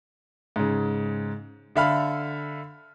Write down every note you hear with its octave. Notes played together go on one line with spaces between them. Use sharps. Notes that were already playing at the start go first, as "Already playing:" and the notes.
G#2 C#3
D3 A4 E5 F5 B5 F6